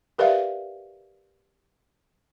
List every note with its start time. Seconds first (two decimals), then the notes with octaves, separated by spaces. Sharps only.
0.18 G4 A#4 B4 D5 E5 F5